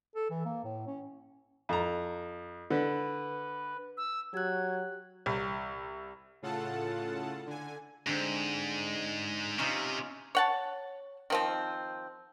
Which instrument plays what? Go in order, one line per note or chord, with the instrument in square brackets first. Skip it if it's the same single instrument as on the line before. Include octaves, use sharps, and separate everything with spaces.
[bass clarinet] A4
E3
A#3
A2
C#4
[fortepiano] F2 A#5
[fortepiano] D3 [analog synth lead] B4
[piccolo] E6
[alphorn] F#3 [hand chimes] G4 F#6 [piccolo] G#6
[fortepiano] C2
[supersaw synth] A2 C#3 F4 A4 F#5 A5
D3 G#5
[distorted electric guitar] G#2 [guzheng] D3 C4
[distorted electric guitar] C3 [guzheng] C#4 D#4 F4
[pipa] C#5 F#5 A5
D#3 F3 C4